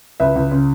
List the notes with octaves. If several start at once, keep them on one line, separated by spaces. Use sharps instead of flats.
C#2 B4 E5
C#2
C#3